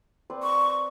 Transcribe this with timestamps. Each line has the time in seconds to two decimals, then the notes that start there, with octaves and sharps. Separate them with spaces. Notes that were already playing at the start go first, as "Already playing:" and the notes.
0.30 C4 B4 D5
0.43 C#6